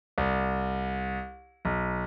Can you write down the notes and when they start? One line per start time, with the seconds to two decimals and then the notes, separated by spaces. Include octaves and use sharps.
0.18 C2
1.65 B1